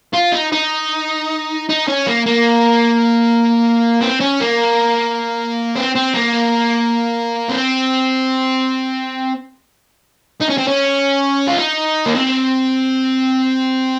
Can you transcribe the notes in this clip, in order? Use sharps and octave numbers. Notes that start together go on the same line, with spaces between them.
F4
D#4
D#4
D#4
C#4
A#3
A#3
C4
C#4
A#3
C4
C4
A#3
C4
D#4
C#4
C4
C#4
F4
D#4
A#3
C4